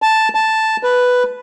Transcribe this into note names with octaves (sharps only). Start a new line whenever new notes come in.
A5
A5
B4